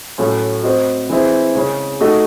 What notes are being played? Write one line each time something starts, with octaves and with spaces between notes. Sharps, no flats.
A2 F#3 A3 C#4
C4 F#4 C5 D#5
E3 G#3 C4 E4
C#3 G#3 C#4 G#4
A3 D#4 F#4 A4 D#5